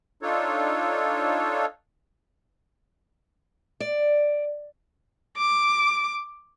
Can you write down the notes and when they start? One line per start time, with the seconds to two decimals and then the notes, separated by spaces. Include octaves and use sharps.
0.22 D4 D#4 F4 A4 C#5
3.80 D5
5.37 D6